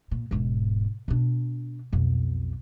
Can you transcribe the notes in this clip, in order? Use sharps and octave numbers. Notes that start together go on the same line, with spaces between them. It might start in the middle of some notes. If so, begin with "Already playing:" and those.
A#2
E1 G#2
B2 D4
B1 F2